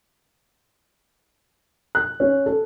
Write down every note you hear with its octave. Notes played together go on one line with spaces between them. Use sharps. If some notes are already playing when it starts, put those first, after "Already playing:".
F#6
C#4
A4